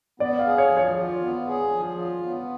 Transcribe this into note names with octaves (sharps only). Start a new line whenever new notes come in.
B3 D5
F5
G#4
C#5
F3
C#5
F4
B3
G#4
F3
F4
B3